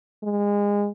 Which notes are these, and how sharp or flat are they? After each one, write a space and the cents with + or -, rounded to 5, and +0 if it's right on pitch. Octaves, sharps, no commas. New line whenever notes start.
G#3 -25